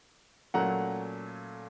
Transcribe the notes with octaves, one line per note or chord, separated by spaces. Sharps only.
A#2 F#3 A3 C#4 F#5 A#5